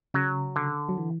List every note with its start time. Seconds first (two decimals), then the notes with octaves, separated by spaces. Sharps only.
0.14 C#3 F#3
0.56 D3
0.89 F#3
0.98 E3